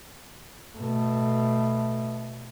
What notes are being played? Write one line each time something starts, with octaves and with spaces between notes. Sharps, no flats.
B2 A3